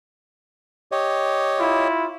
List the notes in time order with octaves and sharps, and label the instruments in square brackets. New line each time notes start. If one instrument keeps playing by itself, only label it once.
[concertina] G4 C#5 D#5
[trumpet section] E4 F4